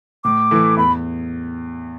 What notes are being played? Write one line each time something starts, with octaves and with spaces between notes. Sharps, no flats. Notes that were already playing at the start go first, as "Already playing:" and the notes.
A2 D6
E3 A3 E4
E2 B5